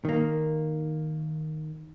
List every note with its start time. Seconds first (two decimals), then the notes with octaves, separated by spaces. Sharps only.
0.05 D#3 A#3